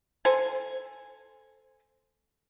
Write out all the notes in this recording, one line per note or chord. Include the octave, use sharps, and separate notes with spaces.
A4 C5 G#5